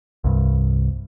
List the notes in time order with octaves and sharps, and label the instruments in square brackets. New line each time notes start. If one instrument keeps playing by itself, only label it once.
[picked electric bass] C2 G2